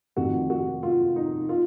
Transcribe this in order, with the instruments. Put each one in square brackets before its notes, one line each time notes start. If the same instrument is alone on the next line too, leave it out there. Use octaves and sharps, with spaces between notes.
[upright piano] F1 F2 D#3 F#4
F#4
F4
D#4
F4